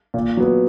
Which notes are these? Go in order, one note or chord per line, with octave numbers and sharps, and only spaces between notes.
A#2
F#3 B3